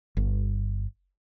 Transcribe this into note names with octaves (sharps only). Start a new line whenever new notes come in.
G1